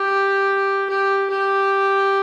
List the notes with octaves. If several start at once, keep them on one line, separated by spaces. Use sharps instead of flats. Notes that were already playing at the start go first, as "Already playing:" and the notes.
Already playing: G4
G4
G4